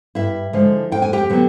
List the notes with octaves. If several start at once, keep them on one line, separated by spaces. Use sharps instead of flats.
G2 E4 E5
D3 F3 G#3
F2 G5
G#5
G4 G5
D3 F#3 B3